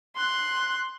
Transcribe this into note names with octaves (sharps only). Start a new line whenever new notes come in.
C6 F#6